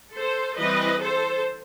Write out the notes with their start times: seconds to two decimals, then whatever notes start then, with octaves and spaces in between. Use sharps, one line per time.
0.14 A4 C5
0.58 E3 G3 C4 B4 D#5
1.01 A4 C5